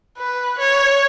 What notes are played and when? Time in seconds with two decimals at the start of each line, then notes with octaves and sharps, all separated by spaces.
0.18 B4
0.59 C#5